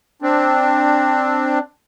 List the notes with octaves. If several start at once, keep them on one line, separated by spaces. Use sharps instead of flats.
C4 D4